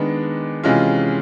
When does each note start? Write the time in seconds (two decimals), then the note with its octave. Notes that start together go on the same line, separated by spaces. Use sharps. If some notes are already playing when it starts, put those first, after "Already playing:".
Already playing: D#3 G#3 B3 D4
0.63 C3 E3 G#3 C#4 F4